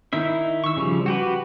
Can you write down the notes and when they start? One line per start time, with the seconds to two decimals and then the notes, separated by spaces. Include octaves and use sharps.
0.13 D#3 D#4 E4 E5
0.64 C#6 E6
0.77 C#3 F3 G3
1.06 F#4 G4 B4